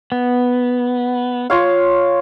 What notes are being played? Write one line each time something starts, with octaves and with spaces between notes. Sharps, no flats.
B3
F4 C#5 F5